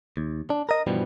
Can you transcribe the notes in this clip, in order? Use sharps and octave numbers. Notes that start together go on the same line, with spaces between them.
D#2
D4
A#4 D#5
G2 B2 E3 F3 G3